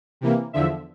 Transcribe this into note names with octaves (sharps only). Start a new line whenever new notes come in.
C3 E3 A#3
E2 D3 F3 E5